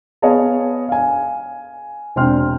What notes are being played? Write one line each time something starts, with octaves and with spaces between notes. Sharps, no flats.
B3 G#4 C#5 D#5 F5 A5
F5 G#5
E1 C4 D4 G5 C6 F6